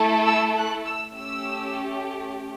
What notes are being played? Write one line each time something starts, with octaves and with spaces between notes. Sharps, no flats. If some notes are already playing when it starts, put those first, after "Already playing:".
Already playing: A3 E4 A4
E6
F#6
E6
A3 C#4 G4 E6